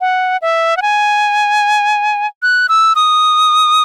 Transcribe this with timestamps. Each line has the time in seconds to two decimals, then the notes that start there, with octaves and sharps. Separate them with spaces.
0.01 F#5
0.42 E5
0.77 F#5
0.82 G#5
2.43 F#6
2.69 E6
2.96 D#6